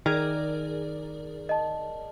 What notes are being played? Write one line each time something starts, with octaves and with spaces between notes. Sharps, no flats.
D#3 G#4 A#4 D5 F6 G#6
D#5 A5